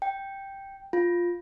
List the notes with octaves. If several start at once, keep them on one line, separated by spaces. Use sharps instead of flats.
G5
F4